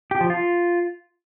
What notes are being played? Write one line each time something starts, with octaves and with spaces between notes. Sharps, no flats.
G4
F3
F4